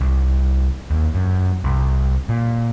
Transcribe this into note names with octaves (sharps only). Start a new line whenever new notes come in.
C2
D#2
F#2
C2
A#2